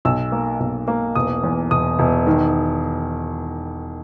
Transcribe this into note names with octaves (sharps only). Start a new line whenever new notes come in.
B1 E6
A#3
B1
A#3
E1 D#6
E2
E1 D#6
E1
D#3